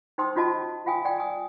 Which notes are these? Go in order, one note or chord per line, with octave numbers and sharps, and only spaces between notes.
D#4 C5 G5 C6 D#6
C#4 D#4 F4 F#4 D#5 A5
F4 F5 G5 G#5 D#6
D5 G5
G#5 D#6